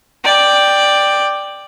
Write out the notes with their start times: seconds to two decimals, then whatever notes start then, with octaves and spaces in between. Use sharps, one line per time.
0.24 D5 G5